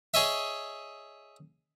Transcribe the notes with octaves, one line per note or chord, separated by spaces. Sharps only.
G#4 C#5 D#5 E5